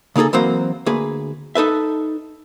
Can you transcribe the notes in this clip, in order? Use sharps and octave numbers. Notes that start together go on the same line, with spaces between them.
C#3 A#3 D#4 G#4 A4
E3 F#3 A#3 C4 C5
D2 A#3 G#4 B4
D#4 A4 B4 E5